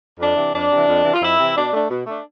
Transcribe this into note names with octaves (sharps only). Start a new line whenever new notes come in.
F2 D4
C3 E3
F2 D4
C3 E3
F2
C3 E3
F4
F2 E4
C3 E3
B2 D4
A3 D4
B2
A3 D4